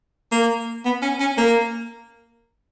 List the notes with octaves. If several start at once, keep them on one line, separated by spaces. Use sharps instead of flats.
A#3
B3
C#4
C#4
A#3